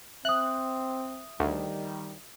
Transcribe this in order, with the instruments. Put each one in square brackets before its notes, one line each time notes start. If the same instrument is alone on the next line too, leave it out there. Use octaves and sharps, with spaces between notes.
[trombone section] C4 [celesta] E5 D#6 [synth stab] F#6
[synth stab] D2 [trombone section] D#3 G3